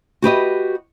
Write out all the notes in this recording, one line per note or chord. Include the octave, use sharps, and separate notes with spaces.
F#4 G4 B4 D#5